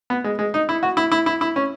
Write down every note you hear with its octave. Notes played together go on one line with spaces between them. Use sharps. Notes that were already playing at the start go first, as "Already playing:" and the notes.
B3
G#3
G#3
D#4
E4
F#4
E4
E4
E4
E4
C#4